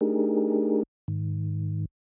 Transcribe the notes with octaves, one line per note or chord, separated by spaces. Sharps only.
A3 D4 D#4 G4 G#4 A#4
G#2 D#3